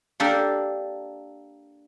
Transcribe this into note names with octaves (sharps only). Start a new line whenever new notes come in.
A#3 D4 G4 A4 A#4